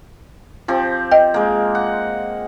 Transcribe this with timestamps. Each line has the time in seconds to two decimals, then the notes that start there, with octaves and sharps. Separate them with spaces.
0.68 F3 C4 G4
1.12 D#5 G5
1.34 G#3 A#3
1.75 F#5